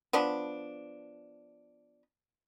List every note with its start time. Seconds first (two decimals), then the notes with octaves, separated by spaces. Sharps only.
0.13 F3 B3 D4